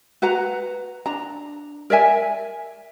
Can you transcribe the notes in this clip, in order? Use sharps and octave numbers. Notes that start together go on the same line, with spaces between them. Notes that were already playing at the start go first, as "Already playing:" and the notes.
F#4 B4 F#5 A#5
D4 A#5
A#4 D5 E5 G#5